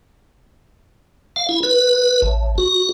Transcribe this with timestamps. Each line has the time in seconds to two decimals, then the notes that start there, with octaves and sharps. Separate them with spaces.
1.36 F5
1.49 E4
1.63 B4
2.22 A1
2.58 F#4